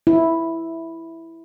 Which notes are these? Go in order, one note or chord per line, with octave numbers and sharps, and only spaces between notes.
E4